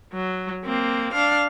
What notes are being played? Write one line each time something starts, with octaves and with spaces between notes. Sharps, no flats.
F#3
A#3 C4
D4 F5